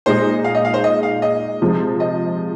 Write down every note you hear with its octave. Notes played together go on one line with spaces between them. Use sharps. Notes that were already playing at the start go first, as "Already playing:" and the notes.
A#2 G#3 D#4 G#4 C5
F5
D#5
F5
C5
D#5
F5
D#5
C3 F3 G#3
D#5